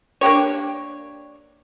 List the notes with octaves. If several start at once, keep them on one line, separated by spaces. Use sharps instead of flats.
A#3 D4 G4 C#5